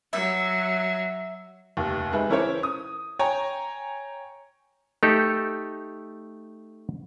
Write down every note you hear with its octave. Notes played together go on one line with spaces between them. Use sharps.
F#3 E5
F1 D#2
G#3 D#4 G#4 B4 E5
E3 C#4 E4 A#4 C5 C#5
D#6
C#5 G5 G#5 A#5
A3 D#4 G4 A4